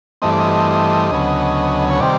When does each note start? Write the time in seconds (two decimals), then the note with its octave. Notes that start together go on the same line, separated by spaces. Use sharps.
0.22 G2 E3 A3 C4 D#5
0.31 D5
0.40 D#5
1.12 D2 C#3 F#3 B3
1.90 C#5
2.00 C3 D#3 G3 C4 D5